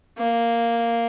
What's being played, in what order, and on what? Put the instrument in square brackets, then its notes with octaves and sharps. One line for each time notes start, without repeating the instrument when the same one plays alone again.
[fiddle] A#3